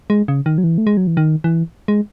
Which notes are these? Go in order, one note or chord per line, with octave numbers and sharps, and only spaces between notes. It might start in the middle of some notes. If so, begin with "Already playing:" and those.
G#3
C#3
D#3
F#3
E3
A3
G#3
F#3
E3
D#3
E3
G#3